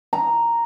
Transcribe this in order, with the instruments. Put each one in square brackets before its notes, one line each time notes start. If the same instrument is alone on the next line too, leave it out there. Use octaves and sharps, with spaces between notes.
[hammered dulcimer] A#5